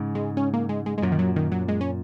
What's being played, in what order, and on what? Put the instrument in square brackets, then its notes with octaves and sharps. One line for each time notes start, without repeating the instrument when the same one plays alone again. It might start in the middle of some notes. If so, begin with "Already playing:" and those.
Already playing: [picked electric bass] G#2 C#3
[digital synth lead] G#3
C#4
A#3
G#3
G#3
G#3
[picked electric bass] F#2 A#2 [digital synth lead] F#3
[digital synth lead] D#3
F#3
D#3
F#3
G#3
C#4